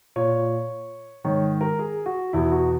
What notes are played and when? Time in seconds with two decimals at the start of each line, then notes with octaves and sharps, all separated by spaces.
0.16 A#2 C#5
1.24 G#2 D#3 C#5
1.61 A#4
1.79 G#4
2.06 F#4
2.33 E2 B2 E4
2.51 F#4